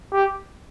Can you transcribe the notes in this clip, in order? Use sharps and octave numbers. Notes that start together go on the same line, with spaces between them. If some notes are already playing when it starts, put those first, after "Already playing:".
G4